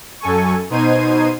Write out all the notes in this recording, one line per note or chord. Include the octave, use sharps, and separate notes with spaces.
F#2 A4 G#5 C#6
B2 D#4 C5 G#6 C7 D#7